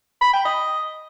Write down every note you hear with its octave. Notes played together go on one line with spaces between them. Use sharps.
B5
G5
D#5